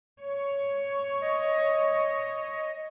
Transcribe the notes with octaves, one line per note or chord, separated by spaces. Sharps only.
C#5
D#5